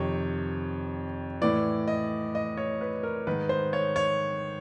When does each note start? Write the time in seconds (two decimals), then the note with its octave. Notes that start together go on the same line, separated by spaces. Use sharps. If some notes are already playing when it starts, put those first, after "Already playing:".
Already playing: F2 C3 D#3 C#5
1.41 A2 E3 D5
1.88 D#5
2.35 D#5
2.57 C#5
2.81 B4
3.03 A#4
3.27 G#2 D#3 B4
3.49 C5
3.73 C#5
3.96 C#5